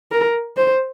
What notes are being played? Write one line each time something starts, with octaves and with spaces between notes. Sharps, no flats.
A#4
C5